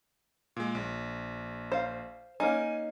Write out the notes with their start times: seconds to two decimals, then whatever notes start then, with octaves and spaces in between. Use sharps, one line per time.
0.56 A#2 G#3
0.75 A#1
1.72 C5 F5
2.40 A#3 C#4 D#4 G#5